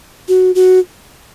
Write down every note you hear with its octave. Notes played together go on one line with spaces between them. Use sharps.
F#4
F#4